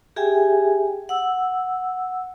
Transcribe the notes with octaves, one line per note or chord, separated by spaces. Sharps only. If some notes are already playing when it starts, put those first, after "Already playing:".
G4 G#4 E5 G5 G#5
F#5 E6